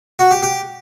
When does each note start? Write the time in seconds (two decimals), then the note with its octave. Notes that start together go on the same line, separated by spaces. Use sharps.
0.19 F#4
0.31 G4
0.43 G4